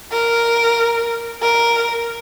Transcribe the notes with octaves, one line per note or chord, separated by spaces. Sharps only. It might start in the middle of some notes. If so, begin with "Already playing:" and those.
A#4
A#4